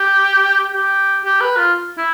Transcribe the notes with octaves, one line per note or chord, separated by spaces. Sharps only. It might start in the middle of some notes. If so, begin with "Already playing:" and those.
Already playing: G4
G4
G4
B4
F4
E4